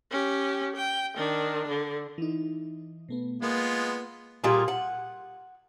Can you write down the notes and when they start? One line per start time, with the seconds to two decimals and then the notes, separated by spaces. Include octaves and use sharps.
0.12 C#4 G4
0.76 G5
1.17 D#3 D4
1.68 D3
2.18 E3 D#4
3.09 B2 A3 B3
3.42 G#3 A#3 B3 F4
4.44 A#2 G3 F4 G#4
4.68 F#5